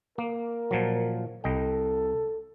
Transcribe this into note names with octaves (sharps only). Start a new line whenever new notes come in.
A#3 A#4
A#2 F3 F#3
C2 A4 D#5 G5